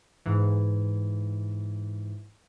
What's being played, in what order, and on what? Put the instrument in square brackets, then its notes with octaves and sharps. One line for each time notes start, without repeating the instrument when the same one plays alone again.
[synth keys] G#2 E3